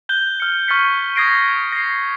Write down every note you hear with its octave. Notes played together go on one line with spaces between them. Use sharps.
F#6 G6 G7
F6 C#7
C#6 F6 G#6 A6 B6 C#7
D#6 G#6 A#6 C7 D7
A#6 C7